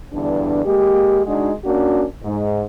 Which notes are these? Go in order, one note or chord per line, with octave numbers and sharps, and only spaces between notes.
E2 G2 D3 D4
G#3 A#3 G4
G#3 D4 D#4 F#4
A#3 C#4 D4 F#4
G#2